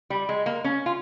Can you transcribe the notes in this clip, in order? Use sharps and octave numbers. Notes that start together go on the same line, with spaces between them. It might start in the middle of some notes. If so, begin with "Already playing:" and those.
G3
G#3
A#3
C#4
F4